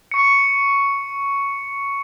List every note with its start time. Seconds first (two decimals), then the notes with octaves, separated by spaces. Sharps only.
0.12 C#6 C#7